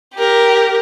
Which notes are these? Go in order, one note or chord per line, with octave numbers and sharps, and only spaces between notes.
G4 A#4